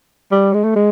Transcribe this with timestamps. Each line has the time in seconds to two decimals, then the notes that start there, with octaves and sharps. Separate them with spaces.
0.32 G3
0.54 G#3
0.64 A3
0.76 G#3